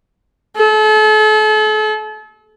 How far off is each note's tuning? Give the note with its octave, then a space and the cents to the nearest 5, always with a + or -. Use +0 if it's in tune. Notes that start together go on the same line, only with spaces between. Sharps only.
A4 -40